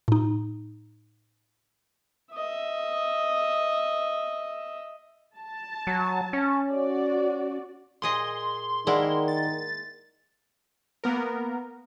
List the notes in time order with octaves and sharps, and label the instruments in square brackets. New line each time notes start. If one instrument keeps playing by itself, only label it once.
[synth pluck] A2 D#4
[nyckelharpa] D#5 E5
[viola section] A5
[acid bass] F#3
C#4
[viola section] F#4 D5
[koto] A#2 G#4 D#5 [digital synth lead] C6
[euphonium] D#3 [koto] G#3 A#3 E4 [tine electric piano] G#4 D5 F#5
[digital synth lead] A6
[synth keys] A#3 B3 A#4